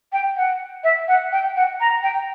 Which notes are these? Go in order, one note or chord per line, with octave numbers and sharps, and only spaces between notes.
G5
F#5
E5
F#5
G5
F#5
A#5
G5